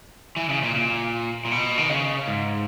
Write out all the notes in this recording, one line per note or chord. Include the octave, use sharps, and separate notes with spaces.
E3
C#3
A#2
A#2
A#2
B2
D#3
C#3
G#2